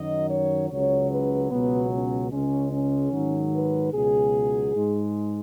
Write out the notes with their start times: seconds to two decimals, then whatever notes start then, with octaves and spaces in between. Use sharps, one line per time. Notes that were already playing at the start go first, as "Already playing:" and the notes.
Already playing: F#2 D#3 F#3 D#5
0.29 C#5
0.70 C#2 C#3 F#3 C#5
1.10 B4
1.50 C#2 B2 F#3 B3
1.90 C#4
2.31 C#2 C#3 G#3 C#4
2.71 C#4
3.11 G#2 D#3 F#3
3.53 B4
3.93 C#2 B2 F#3 G#4
4.74 G#2 G#3